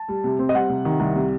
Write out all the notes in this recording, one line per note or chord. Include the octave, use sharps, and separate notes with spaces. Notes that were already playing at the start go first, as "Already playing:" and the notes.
Already playing: A5
G3
C3
C4
D#5
G3 F#5
C3
D#3
C2
C3